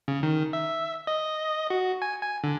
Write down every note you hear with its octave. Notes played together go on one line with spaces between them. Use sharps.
C#3
D#3
E5
D#5
F#4
G#5
G#5
D3